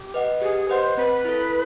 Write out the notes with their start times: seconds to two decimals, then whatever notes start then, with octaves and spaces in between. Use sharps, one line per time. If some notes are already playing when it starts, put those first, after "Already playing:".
Already playing: G4
0.14 B4 D#5 F#5
0.42 G4 G#4
0.69 B4 C5 D#5 F#5
0.97 C4 B4
1.25 E4 A4